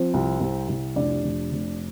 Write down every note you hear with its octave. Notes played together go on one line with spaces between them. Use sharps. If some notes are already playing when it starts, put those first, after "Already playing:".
Already playing: F3 C4 C5
C2
C2
C2
F1 D4 D5
F1
F1